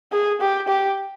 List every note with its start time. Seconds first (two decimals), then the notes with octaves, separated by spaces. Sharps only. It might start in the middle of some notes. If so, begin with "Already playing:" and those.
0.12 G#4
0.41 G4
0.68 G4